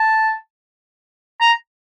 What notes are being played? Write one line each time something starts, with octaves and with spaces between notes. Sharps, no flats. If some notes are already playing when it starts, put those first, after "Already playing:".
Already playing: A5
A#5